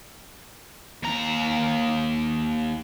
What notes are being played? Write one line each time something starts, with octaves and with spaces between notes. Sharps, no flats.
D#2 A#5